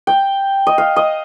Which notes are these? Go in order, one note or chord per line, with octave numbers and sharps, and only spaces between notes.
G5
D#5
F5
D#5